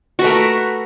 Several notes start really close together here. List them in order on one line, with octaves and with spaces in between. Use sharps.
F#4 B4 A3 A#4